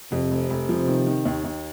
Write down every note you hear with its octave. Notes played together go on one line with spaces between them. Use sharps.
F2 C3
F1
F1
F3
D#3
D#3
D#2
D#2